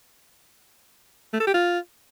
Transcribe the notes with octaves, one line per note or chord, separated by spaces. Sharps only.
A3
A4
G4
F4